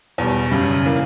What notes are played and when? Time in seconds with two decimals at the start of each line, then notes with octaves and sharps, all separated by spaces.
0.18 E2 B2 G3
0.51 F#2 C#3 G3
0.86 E3 A#3